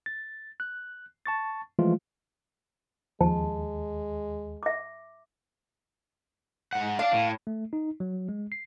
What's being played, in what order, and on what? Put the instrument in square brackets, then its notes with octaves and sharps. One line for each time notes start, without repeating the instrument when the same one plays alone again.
[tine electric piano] A6
F#6
A5 C#6 A6
E3 F3 G#3 A3 F4
[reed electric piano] D#2 [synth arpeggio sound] F3 [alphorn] G#3 [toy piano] A5
[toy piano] E5 D6
[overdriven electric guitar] G#2 F#5
[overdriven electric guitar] D4 D5 [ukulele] F5
[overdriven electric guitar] A2
[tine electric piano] A3
D#4
F#3
G#3
C7